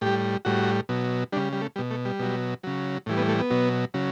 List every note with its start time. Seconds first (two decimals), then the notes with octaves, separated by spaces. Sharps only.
0.01 A2 G3 G4
0.45 A2 G3 F#4
0.89 B2 F#3
1.32 G3 D4
1.36 C#3
1.53 G3
1.62 A3
1.76 G3
1.79 B2
1.91 A3
2.05 G3
2.19 B2 F#3
2.63 C#3 F#3
3.06 A2 E3 G3
3.17 B3
3.28 A3
3.39 B3
3.50 B2 F#3
3.94 C#3 F#3